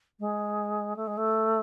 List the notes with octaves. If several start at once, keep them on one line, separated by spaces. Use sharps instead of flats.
G#3
A3
G#3
A3